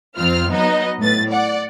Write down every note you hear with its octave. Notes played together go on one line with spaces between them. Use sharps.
F2 C4 F4 F6
F#3 B3 D#4 D#5
A2 B4 A6
D5 F#5